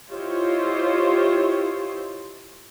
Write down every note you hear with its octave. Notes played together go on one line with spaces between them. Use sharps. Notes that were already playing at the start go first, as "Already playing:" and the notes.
E4 F4 G4 C5 C#5 D#5